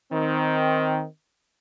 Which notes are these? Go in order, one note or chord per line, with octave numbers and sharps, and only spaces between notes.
D#3 C4